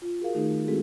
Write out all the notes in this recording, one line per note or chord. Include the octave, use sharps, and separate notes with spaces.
F4
F#4 G#4 A#4 F5
D#3 A3 D#4 G#4
G#3 C4 E4 F#4 G#4 A4